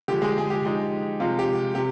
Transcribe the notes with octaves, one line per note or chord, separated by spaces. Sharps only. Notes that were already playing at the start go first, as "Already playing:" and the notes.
D3 F3 G#3 G4
G#3 G#4
G#4
G4
F3 G#3 D#4
C3 F3 G#3 F4
G4
C3 G4